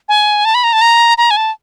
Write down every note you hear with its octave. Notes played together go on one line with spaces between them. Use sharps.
G#5
A5
B5
A#5
A5
A#5
A#5
G#5
A5